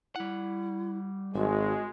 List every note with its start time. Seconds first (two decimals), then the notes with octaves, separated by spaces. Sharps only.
0.16 G3 E4 F#5
1.34 G#1 G#3 F#4